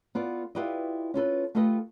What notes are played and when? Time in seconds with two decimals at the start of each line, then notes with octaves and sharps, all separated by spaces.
0.15 B3 F4 A4 D5
0.55 E4 F4 G4 B4 D5 D#5
1.14 C#4 F4 A4 B4
1.55 A3 F4 G4 A4 B4 D#5